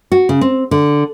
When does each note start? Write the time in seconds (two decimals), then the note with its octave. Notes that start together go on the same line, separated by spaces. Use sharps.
0.12 F#4
0.29 C#3
0.41 C4
0.71 D3